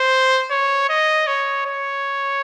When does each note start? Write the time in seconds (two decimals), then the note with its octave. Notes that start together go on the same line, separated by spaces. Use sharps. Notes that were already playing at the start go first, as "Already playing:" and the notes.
Already playing: C5
0.51 C#5
0.89 D#5
1.27 C#5
1.66 C#5